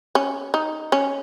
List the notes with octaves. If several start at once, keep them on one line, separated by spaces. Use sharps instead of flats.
C#4
D#4
C#4